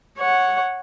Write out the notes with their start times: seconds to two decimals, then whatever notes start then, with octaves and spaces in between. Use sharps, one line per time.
0.18 C#5 F#5